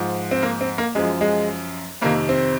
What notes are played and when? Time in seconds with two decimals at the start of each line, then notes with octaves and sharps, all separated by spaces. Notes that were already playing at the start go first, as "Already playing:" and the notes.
Already playing: G#2 F3
0.31 C4
0.43 A#3
0.61 C4
0.78 A#3
0.95 F#2 F3 G#3
1.21 G#3
2.02 F2 C3 D#3 A#3
2.29 C4